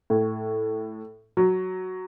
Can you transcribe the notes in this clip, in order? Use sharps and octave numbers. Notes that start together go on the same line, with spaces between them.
A2
F#3